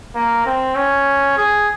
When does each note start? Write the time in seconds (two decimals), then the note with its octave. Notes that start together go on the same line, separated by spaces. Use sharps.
0.15 A#3
0.46 C4
0.76 C#4
1.37 G#4